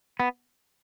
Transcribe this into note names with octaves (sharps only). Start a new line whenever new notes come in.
B3